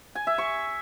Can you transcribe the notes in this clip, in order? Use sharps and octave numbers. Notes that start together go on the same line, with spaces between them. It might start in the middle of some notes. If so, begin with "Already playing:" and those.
G#5
E5
C#6